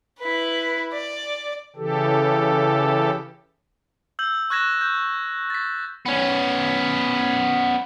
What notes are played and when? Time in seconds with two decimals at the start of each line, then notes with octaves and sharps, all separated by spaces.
0.19 E4 B4
0.93 D5
1.76 C#3 E3 G4 A4
4.19 E6 G6 F#7
4.50 C#6 F#6 G#6 A#6 E7
4.81 G6
5.50 A6 B6
6.06 B3 C#4